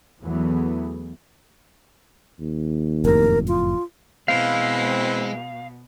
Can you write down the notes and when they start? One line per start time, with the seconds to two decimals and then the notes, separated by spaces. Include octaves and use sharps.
0.22 E2 E3 F#3 A3 B3
2.40 D#2
3.05 F#1 F2 A2 A#4
3.48 F4
4.28 B2 E3 G#3 C4 F5